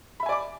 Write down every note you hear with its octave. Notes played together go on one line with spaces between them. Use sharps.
D5 E5 G#5 B5 D6